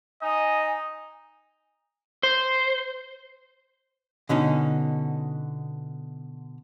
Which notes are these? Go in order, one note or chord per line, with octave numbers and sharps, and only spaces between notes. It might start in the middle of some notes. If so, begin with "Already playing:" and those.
D#4 D#5 G#5
C5
B2 D3 C#4 D#4